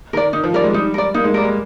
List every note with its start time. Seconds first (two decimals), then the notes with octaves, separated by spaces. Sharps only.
0.13 D#3 A#4
0.17 D5
0.33 D#3 D#4
0.44 F3
0.53 G3 A#4 D5
0.64 G#3
0.73 G3 D#4
0.94 A#4 D5
1.14 A#3 D#4
1.24 G#3
1.34 G3 A#4 D5
1.44 G#3